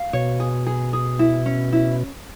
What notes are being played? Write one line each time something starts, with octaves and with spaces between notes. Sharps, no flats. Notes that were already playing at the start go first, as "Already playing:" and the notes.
Already playing: F5
B2 C#5
G#4
G#4
G#4
E4
C#4
E4